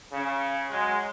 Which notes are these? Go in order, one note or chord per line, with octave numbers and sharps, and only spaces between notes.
C#3
F#3 G#3